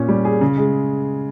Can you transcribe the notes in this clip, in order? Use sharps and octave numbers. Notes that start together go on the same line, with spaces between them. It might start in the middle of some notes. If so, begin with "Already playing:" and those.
Already playing: A#2 C#4
G3
G#4
C#3
G#3